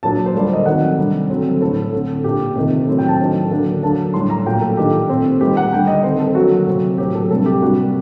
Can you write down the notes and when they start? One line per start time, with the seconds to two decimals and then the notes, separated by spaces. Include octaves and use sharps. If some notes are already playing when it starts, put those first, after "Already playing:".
0.03 A#2 F#3 A#3 D4 A5
0.26 C5
0.35 D3 G3 A#3 D5
0.53 D#5
0.66 D#3 F#3 A3 C4 F#5
0.98 C3 G3 D4
1.30 D3 F#3 A3 C4
1.61 A2 A3 D4 A4
1.92 D3 A3 C4
2.24 A#2 A3 D4 G4
2.56 C3 D#3 A3
2.87 A2 F#3 C4
2.98 G5
3.08 A5
3.19 D#3 F#3 A3 D4
3.51 D3 F#3 A#3 D4
3.83 D3 F#3 A#3 D4 A5
4.14 A2 G3 D4 C6
4.30 A#5
4.46 A#2 F#3 A3 G5
4.61 A4
4.77 D#3 A3 D4 G4
5.09 A#2 A3 C4
5.40 D#3 G3 A#3 G4
5.57 F#5
5.72 D3 G3 D4 G5
5.87 D#5
6.03 D#3 A3 C4 C5
6.20 A4
6.35 D3 F#3 A#3 F#4
6.67 C3 F#3 C4
6.98 A2 F#3 A#3 G4
7.15 A4
7.30 C3 G3 D4 A4
7.46 G4
7.62 C3 G3 A#3 D4 F#4